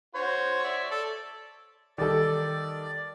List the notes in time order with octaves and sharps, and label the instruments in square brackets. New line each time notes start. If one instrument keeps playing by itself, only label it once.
[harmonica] F#4 C5 [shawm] C#5
[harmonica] D5 E5
[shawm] A4 [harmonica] D5
[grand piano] D#3 G3 A4 [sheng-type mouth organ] D5